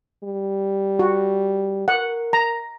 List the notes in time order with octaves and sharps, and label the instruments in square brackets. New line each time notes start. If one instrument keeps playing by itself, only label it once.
[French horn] G3
[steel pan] F#4
[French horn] A#4 [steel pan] F#5
[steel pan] A#5